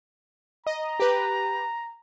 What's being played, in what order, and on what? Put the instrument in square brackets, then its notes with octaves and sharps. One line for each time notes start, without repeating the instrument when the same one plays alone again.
[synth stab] D#5 [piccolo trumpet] A#5
[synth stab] G4 B4